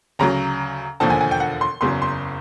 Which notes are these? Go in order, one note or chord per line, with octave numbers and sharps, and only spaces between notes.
D2 C#3 F#3 A#5
E1 D#2 D3 F3 A5
G#5
G#5
G5
F#5
C6
F#1 E2 C#3 F#3 C6
C6